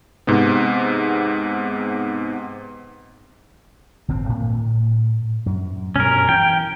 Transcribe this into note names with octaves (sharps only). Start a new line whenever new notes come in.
G#2 C3 B3
G1 A2 C4
A2
F#2
G2 B2 C#4 A#4
E3 G5